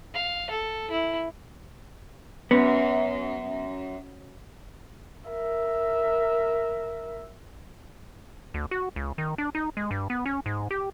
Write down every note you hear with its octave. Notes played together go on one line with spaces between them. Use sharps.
F5
A4
E4
F#2 B3
A#4 E5
D2
F#4
C#2
D#3
D4
D#4
G#3
G2
B3
C#4
G#2
G4